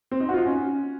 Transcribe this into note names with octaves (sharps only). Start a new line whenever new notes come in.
C4
D#4
F#4
F4
D#4
C#4